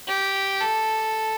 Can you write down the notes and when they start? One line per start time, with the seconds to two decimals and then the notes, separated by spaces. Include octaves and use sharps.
0.08 G4
0.61 A4